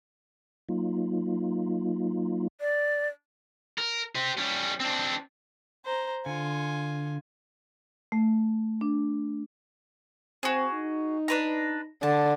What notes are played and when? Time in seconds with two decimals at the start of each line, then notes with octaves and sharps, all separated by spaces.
0.69 F#3 A#3 D#4 F4
2.61 D5
3.78 A#4
4.15 G4 C5
4.37 G3 C#4
4.80 C4 D4
5.85 C5 A#5
6.26 D3 F4 G#5
8.12 A3
8.81 D4
10.43 C4 F#4 G#4
10.74 D#4
11.28 D4 B4 A#5
12.03 D3 A5